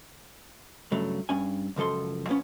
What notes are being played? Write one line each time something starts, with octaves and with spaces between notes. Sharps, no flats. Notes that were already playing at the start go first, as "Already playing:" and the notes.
G2 C#3 F#3 A3
G2 C#4 G#5
C#2 F#2 F3 A4 C6
F3 B3 C#4